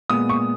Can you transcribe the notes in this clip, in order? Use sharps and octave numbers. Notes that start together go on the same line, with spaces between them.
A#2 G#3 B3 D#6
C#6